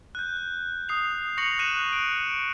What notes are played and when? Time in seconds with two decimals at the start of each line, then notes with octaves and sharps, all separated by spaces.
0.15 F#6 G6
0.37 G6
0.89 D#6 C7 F7
1.38 C#6 A#6 C#7 F7 F#7
1.59 F#6 D#7 E7
1.92 D7